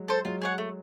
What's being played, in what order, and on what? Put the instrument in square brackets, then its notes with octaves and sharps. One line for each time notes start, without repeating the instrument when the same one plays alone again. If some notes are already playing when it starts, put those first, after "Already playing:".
Already playing: [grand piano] F#3 G#3
[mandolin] A4 C5
[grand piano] F#3 G#3 [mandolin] F4
[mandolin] G#4 C#5 F#5
A3